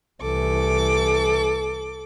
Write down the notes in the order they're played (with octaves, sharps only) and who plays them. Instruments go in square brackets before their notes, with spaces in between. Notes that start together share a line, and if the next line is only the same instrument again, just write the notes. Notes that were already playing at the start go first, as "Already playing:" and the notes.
[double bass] C2 E3 [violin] A4 D6